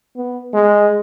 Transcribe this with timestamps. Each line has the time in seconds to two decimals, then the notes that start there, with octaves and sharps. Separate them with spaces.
0.17 B3
0.54 G#3